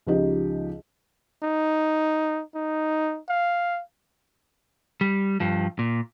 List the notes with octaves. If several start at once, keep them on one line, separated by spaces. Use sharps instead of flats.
C#2 F3 D#4 G4 D#5
D#4
D#4
F5
G3
G2 F3
A#2